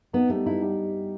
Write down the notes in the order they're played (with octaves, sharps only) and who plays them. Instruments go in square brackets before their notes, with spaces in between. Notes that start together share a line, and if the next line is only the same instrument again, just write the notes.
[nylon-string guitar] B3 [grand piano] D#4
[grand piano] G3 [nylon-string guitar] A3
[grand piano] D#4 [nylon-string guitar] E4
[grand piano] G3